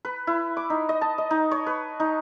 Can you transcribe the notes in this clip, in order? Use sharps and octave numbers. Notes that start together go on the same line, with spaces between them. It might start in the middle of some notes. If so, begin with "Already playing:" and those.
B4
E4
D6
D#4
D#5
A5
D#5
D#4
C#5
B4
D#4